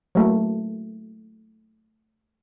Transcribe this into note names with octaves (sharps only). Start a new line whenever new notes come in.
F#3 A3 A#3